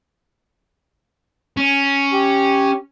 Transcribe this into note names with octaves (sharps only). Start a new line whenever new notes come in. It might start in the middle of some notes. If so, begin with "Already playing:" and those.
C#4
G4